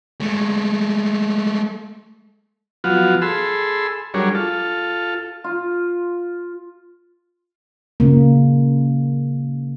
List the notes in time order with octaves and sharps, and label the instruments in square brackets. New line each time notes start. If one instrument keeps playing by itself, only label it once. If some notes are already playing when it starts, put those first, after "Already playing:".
[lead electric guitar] G#3 A3
[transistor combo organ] F3 F#3 B3 F4 F#4
G#4 A4 B5 C6 E6
F#3 G3 D4 G#4 A#4 C#5
F4 A4
[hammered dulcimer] F4
[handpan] C#3 A#3